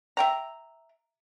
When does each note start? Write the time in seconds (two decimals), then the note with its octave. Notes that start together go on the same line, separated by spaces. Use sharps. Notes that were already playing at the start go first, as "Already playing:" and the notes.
0.17 E5 G5 A#5